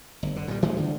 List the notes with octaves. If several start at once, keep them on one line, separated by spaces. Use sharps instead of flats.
G1
D3
A#2 G3
D#3 F3 G#3 A3
D3